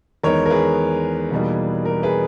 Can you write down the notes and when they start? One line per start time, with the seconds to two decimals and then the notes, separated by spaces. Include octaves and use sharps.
0.23 E2 D#3 G#3 B3 A#4 C#5
0.46 A#4
0.50 G#4 B4
1.31 E2 B2 G3 A#3 D#4
1.85 A#4
2.03 G#4 B4